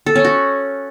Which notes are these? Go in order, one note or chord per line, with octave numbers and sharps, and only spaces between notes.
A4
C#4
F#4